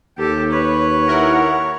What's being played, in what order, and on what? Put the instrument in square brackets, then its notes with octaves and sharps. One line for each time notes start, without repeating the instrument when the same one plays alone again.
[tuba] D#2 [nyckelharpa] G4 A4
[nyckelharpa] B4 [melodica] C#5
[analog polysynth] E4 A#4 F#5